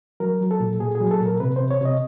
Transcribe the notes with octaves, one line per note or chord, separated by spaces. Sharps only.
F#3 A#4
F#3
A4
A#2
A#2 G#4
G#4
F#3
A4
A#2
A#4
C3 B4
C3 C5
C#5
C3 D#5